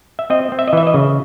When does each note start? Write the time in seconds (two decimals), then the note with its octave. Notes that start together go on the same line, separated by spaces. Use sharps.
0.19 E5
0.30 C4 D#5
0.52 C4
0.59 E5
0.68 D#5
0.73 E3 E5
0.87 D#5
0.94 C#3